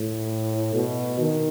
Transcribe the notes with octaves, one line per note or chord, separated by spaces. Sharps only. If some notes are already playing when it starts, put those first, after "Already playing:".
Already playing: A2
B2
D#3